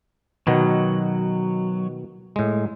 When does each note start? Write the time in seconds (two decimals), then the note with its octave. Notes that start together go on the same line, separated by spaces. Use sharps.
0.47 B2 D#3 F#3 B3
2.36 A2 G#3